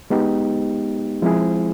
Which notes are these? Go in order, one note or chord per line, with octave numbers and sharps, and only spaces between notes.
G#3 B3 D#4 G4
F3 G#3 C4 E4 G#4